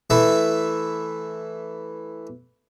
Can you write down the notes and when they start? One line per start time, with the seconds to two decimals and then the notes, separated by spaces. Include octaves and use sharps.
0.10 E3 A3 E5